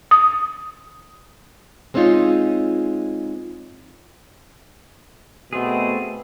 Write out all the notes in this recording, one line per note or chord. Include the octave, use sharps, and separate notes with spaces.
D#6
G#3 C4 C#4 D#4 F4
B2 A3 C4 G#4